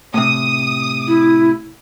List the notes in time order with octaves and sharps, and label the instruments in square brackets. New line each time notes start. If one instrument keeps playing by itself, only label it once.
[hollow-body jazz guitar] A2 C3 [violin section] D#6
[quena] E4